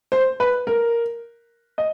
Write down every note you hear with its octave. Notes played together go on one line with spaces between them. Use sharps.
C5
B4
A#4
D#5